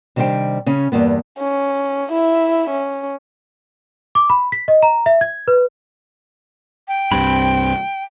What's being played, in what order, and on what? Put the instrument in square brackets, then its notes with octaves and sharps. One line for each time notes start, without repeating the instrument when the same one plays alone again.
[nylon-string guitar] C3 D#3 G3 D4 C5 G5
C#3 C#4
E2 G2 A#3 B3
[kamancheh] C#4
E4 E5
C#4
[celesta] D6
B5
B6
D#5
A#5
E5
G#6
B4
[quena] G5
[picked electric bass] C2 G2 [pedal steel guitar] C4 B5